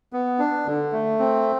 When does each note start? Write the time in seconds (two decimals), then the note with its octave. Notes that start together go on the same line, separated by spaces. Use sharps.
0.13 B3
0.39 D4
0.66 D3
0.92 A3
1.19 C4